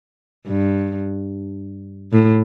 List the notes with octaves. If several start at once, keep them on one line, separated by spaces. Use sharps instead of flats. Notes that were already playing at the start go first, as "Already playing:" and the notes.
G2
A2